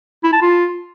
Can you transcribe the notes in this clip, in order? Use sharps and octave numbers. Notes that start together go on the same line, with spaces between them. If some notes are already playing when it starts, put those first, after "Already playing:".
E4
A5
F4